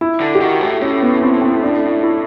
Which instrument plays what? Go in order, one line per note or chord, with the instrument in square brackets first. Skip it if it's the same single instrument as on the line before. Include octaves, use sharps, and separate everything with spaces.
[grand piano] E4
[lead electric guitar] D3
[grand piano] G4
[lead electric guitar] D#3 [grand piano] F#4
[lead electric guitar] A2
[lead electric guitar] A2 [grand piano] C#4
[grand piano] B3
C4
C4
D4
E4